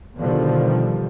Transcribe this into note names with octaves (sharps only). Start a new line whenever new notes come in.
B2 D3 D#3 F3 G3